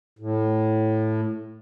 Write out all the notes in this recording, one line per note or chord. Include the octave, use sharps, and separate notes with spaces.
A2